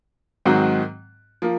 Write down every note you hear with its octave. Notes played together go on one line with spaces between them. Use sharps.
G#2 D#3 F#3 C4 F#4
F3 A#3